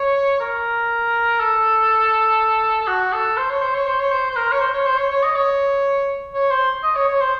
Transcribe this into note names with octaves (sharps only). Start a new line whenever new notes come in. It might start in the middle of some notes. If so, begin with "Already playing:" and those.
Already playing: C#5
A#4
A4
A4
F#4
A4
C5
C#5
C5
C#5
C5
C#5
C5
C5
A#4
C#5
C5
C#5
C5
C#5
C#5
D#5
C#5
C#5
C5
D#5
C#5
C#5
C5